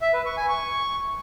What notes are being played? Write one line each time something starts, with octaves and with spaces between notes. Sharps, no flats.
E5
B4
C#6
G#5
C#6